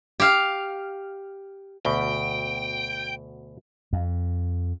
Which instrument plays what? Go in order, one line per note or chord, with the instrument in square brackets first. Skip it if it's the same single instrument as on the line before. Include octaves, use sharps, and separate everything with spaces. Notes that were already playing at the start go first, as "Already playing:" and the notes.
[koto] G4 F5
[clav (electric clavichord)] D2 B2 [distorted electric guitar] G5
[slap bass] F2